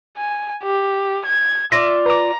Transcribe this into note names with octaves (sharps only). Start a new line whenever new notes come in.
G#5
G4
G#6
F4 D5 E5 A#6
B4 A#5 D6